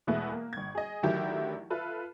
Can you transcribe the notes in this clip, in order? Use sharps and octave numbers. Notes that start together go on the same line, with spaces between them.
E2 B2 G#3 A3 B3 E4
A#3
G1 G#6
G#4 D#5
A1 D3 D#3 F#3 E4 G4
F4 A4 B4 E5